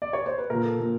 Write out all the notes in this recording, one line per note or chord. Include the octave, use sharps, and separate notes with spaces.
D5
C#5
C5
B4
A#2 F3 A#4
A4
A#2 F3